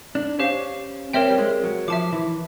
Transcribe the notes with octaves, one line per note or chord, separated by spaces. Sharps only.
D4
C#4 G4 C5 F5
C4 G4 A#4 C#5 E5 G5
G3
G#3
F#3
F3 E5 A5 D6
E3